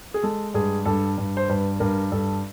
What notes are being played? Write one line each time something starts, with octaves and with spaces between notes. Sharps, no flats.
G#4
G#3 A4
G2 G#4
G2 A4
G2
C5
G2 B4
G2 A#4
G2 A4